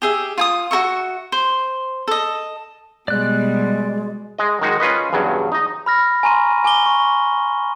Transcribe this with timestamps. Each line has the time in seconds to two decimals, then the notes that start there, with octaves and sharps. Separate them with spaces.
0.02 G4 G#4 E5
0.38 F4 G#5 D#6
0.71 F#4 A#4 E5 C#6
1.32 C5
2.08 A4 D#5
3.08 B2 G3 G#3 D5 F#6
4.39 G#3 D#5
4.61 D#3 G#3 D#4 F#4
4.80 C#4 F4 B4 D#5
5.13 E2 G2 C#3 F#3
5.52 D#4 D#5
5.86 B5 F6 A#6
6.23 G#5 A#5 C6 C#6 D#7
6.64 G#5 D6 G7
6.86 C#6